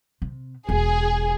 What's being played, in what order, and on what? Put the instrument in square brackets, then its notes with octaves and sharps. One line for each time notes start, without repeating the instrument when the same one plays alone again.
[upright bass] C3
[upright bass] E1 [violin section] G#4